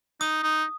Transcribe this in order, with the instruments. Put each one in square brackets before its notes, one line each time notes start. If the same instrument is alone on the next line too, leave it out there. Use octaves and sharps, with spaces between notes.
[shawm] D#4 [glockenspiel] D#6
[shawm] D#4